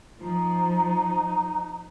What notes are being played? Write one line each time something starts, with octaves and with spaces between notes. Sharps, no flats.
F3 D#4